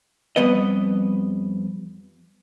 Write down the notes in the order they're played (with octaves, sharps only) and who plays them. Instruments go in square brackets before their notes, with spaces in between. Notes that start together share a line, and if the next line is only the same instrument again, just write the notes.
[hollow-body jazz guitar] F2 G3 B3 B4 D#5